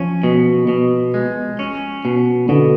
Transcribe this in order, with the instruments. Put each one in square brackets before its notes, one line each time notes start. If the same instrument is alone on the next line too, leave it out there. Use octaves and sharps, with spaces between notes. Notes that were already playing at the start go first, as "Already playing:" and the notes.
Already playing: [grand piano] F3 [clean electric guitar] C#4
[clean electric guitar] B2
B2
G#3
C#4
B2
[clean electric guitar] B2 [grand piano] D3